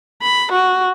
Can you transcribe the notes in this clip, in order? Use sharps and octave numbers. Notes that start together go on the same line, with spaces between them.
B5
F#4